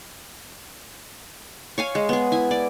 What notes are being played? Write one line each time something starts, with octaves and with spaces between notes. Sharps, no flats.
C#5 F5 G#5
G#3
B3 G#4
E4 G#5
D5